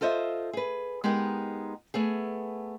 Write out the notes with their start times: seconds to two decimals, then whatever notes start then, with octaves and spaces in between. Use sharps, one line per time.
0.01 F4 A4 C5 D#5 E5
0.53 G#4 B4
1.04 G#3 B3 D#4 G4 A#4
1.94 A3 B3 G#4